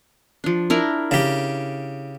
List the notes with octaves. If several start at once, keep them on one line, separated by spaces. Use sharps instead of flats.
F3 D4
D4 E4 A#4
C#3 G4